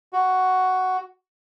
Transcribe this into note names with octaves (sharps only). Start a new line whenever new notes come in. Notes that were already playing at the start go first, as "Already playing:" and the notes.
F#4